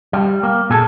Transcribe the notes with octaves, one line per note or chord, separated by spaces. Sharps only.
G3
A#3
A#2 G#4 A4